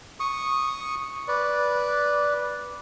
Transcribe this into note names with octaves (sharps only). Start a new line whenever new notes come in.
C#6 D#6
B4 D5